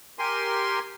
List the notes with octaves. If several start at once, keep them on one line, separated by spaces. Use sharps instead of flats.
G4 A#4 G#5 C6